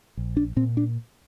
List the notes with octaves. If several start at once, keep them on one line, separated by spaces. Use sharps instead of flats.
A#1
D4
A#2 C4
D4